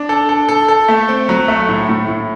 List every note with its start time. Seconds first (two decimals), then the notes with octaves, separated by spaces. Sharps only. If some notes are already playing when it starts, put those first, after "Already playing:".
Already playing: D4
0.09 A4
0.29 A4
0.49 A4
0.68 A4
0.88 A3
1.09 C4
1.29 F#3
1.48 A3
1.69 A2
1.89 A2
2.08 A2